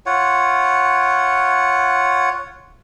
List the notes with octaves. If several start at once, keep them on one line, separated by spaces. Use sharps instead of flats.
F4 C#5 F#5